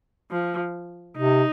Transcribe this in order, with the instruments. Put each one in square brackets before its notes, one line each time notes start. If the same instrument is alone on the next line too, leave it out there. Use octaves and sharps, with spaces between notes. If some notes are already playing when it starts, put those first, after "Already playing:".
[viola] F3
[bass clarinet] C3 [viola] D#4